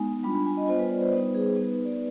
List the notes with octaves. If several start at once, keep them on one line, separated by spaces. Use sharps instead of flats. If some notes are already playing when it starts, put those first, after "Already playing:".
Already playing: G#3 B3 D#4 G#5
G3 D4 F4 B5
B5
G#5
D#5
G3 B3 F4 C5
B4
D5
C5
G3 B3 D#4 B4
G#4
B3 D#4 B4
D5